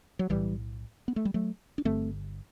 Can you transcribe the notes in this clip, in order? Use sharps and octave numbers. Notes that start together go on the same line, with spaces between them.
F#3
B1 A2 E3 G3
B3
A3
G3
F#3 A3
D4
G1 G2 D3 A3 C4